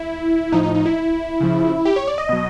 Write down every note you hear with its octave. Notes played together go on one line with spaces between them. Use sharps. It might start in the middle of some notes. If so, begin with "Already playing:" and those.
Already playing: E4
A2 F3 D#4
D#4
D#4
E4
C#3 F3
G4
C#5
D5
D#5
B2 F#3